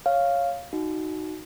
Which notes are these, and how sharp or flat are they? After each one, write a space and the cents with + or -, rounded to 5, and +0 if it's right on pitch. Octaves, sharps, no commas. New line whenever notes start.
C#5 +0 F5 +0
D#4 +0 F#4 +0